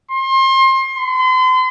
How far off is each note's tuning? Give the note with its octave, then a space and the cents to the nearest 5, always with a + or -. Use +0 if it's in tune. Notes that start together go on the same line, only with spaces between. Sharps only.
C6 +30
C6 -40